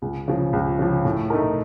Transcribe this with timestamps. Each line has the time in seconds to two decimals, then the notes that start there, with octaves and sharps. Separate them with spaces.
0.02 C#2
0.28 C#3 F3
0.53 C#2
0.79 C#3 F3
1.05 A2
1.30 A3 D#4 A#4